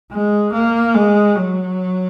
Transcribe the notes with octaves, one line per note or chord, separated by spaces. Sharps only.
G#3
A#3
G#3
F#3